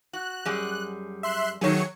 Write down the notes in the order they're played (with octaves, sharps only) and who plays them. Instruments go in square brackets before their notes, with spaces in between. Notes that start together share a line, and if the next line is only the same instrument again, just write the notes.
[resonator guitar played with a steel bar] F#4 [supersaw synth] F#6
[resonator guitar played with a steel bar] F#2 G3 G#4
[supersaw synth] E5 C6 F#6
[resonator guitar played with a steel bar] D#3 A3 G#4 [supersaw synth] F#3 C#5 C#7